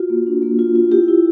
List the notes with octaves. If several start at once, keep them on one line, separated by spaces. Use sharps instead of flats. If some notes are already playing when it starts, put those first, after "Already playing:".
Already playing: F4 F#4
A#3
D4
A#3
F4
F4
E4 G4
E4